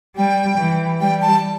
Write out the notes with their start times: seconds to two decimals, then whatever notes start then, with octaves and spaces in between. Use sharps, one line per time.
0.16 G3 G5
0.58 E3
1.00 G3 G5
1.21 A5